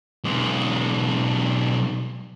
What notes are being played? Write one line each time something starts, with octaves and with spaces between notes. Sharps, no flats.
B1 G#3